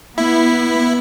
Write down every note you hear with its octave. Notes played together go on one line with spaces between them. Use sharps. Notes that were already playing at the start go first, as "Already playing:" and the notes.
B3 E4